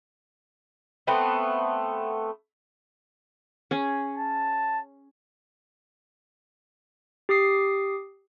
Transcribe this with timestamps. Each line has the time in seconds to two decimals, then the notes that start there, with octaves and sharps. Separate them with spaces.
1.07 A3 B3 C4
3.71 C#4 G#4
4.17 A5
7.29 G4 D6 D#6 C7